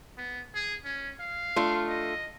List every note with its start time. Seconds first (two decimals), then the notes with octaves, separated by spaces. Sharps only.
0.18 B3
0.55 G#4
0.85 C#4
1.20 F5
1.56 A3 D4 F4
1.88 D#5